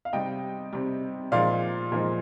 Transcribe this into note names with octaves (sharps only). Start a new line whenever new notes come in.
F5
C3 G3 D#5 G5
C3 G3
A#2 F3 G#3 D5 F5
A#2 F3 G#3